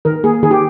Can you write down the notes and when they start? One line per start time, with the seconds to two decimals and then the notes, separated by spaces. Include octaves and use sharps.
0.05 D#3 A#4
0.24 A#3 G#4
0.43 D#3 G#4
0.51 G4